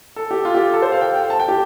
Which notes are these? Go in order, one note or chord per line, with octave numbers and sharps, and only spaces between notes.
A4
G4
F4
G4
A4
C5
F5
G5
G5
A5
G5
G4